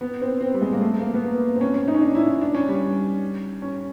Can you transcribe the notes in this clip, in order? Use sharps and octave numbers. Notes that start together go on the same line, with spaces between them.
B3
C4
C4
G3
G#3
A#3
A3
A#3
B3
A#3
C4
C#4
C#4
D#4
C#4
D4
E4
D4
C#4
G3
C#4